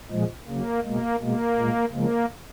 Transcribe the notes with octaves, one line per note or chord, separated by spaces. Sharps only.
A#2 F3 G#3
C#3 F#3 A#3
B2 G#3 A#3
B2 G#3 A#3
A#2 G#3
C#3 F3 G#3 A#3